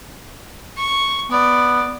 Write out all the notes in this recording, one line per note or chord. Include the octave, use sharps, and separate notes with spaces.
C#6
B3 D5